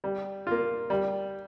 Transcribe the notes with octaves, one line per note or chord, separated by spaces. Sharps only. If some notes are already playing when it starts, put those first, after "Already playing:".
G3
A#3 F4
G3